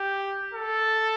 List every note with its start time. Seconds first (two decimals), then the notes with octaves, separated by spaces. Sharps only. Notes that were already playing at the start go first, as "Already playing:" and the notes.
Already playing: G4
0.53 A4